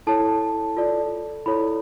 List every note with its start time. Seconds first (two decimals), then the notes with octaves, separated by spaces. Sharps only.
0.07 E4 A4 C#5 A5
0.77 F4 A4 D5
1.46 E4 A4 C#5 B5